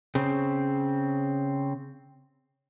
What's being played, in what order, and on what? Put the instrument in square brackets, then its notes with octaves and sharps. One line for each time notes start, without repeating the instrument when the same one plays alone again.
[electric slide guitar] C#3 C4